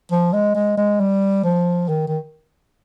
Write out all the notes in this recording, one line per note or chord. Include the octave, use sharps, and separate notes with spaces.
F3
G#3
G#3
G#3
G3
F3
D#3
D#3